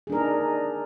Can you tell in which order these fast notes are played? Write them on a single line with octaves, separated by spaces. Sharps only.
G#4 D4 A#4 D#4